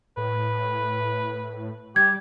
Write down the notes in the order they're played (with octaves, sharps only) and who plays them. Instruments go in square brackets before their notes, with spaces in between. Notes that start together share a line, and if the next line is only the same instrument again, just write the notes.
[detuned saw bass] A2 [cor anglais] B4
[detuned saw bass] G3 [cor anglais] G4 [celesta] G#6